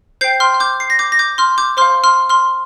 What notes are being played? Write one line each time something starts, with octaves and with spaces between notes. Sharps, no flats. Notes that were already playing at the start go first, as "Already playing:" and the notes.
C5 G5 G6 C7
C6 F6
F6
D6 G6
C7
A#6
D6 G6
A#6
D6 G6
C6 F6
D6 G6
C5 F5 C6 F6
C6 F6
C6 F6